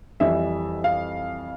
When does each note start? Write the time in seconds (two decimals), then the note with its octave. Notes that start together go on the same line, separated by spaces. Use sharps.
0.20 F2 E3 G3 E5
0.84 F5